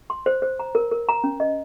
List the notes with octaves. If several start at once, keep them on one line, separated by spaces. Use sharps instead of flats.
C6
C5
C5
A#5
A#4
A#4
A#5
C#4
D#5